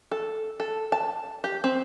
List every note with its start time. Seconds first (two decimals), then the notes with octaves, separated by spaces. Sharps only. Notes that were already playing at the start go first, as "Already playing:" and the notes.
0.11 A4
0.60 A4
0.92 A5
1.44 G4
1.64 C4